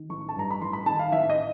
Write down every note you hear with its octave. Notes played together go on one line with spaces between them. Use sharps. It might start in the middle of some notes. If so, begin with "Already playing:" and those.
Already playing: D#3
A1 C#6
A5
G2 A#5
B5
A1 C6
B5
D#3 A5
F5
A1 E5
D#5